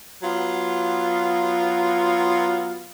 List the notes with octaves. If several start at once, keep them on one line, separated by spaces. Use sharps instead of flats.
F#3 B3 F4